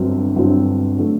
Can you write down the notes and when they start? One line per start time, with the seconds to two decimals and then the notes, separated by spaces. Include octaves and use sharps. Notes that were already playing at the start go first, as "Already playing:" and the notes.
Already playing: G1 G2 F#3 C4
0.36 G1 G2 F#3 C4
0.98 D3 F#3 A3